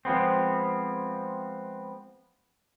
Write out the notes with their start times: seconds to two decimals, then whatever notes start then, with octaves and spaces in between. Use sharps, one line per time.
0.05 F3 G#3 B3 C4